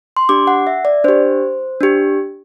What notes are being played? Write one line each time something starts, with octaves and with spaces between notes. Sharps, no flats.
C6
D4 G4 D6
F#5
E5
D5
D4 G4 C5
D4 G4